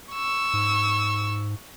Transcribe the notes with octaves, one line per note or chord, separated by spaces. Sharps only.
C#6 E6
G#2